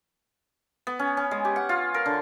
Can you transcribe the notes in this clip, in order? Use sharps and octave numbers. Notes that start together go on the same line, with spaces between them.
B3
C#4
C#4
G#3
G4
F#5
F4
A#4
D3